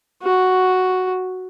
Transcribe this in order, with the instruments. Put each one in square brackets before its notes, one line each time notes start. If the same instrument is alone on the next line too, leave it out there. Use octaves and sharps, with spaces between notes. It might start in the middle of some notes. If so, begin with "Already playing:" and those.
[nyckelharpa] F#4